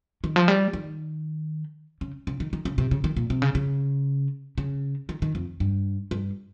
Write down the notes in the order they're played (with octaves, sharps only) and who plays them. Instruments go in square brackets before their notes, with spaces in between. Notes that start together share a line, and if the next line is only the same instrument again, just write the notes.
[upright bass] D#3
F3
G3
D#3
C#3
C#3
D#3
D#3
C#3
C3
C#3
D#3
A#2
C3
C#3
C#3
C#3
D#3
D#3
F2
G2
G2